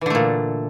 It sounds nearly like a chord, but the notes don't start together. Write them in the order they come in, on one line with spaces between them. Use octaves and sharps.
E3 D3 A3 A#2